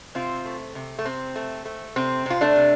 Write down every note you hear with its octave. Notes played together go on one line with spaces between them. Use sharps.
C3 C4 F4
A3
C3
A3
C3 C4
A3
A3
C3 C4
C3 F4
A3 D4
C3